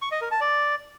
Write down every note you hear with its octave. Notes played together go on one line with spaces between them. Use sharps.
C#6
D#5
A#4
A5
D5